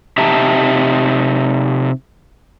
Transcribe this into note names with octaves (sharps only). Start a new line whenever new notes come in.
C3 D#4 G4 E5 A5 A#5